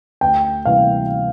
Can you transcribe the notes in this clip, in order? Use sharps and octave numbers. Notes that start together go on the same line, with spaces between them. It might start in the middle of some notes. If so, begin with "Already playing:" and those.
D2 G5
C3 E3 G3 A#3 F5